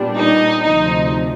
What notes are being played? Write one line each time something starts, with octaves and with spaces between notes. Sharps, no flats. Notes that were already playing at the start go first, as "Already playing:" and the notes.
Already playing: A#2 G3 B3 D4
D#4
D2 C3 F3 D#4